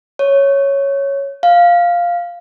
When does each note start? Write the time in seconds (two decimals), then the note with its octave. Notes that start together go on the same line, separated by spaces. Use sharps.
0.19 C#5
1.43 F5